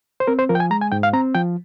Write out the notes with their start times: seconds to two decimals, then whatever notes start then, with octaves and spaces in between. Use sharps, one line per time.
0.20 C5
0.27 C4 A#4
0.39 C5
0.49 F3 A#4
0.55 G5
0.60 G#5
0.71 G#3 A#5
0.81 G#5
0.92 G#2 G5
1.03 F5
1.13 C4 A#5
1.35 F3 G5